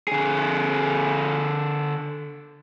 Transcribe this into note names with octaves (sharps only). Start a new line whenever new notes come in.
D3 G#4